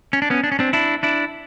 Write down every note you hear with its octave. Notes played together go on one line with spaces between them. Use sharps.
C#4
D4
B3 C#4
D4
C#4
C4 D4
D4 E4
D4 E4